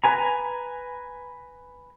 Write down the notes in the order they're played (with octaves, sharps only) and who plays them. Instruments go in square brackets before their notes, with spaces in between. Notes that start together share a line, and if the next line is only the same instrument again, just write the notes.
[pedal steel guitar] B4 G#5 A#5